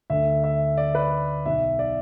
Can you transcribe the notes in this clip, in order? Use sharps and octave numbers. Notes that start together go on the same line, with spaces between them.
D2 D3 E5
E5
D5
B4
D5
B1 B2 E5
D5